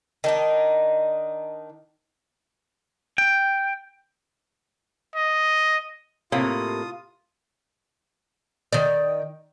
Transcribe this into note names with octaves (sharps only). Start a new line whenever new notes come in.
D#3 D4 D#4
G5
D#5
A2 C3 A#3 F4 D#6
D#3 D5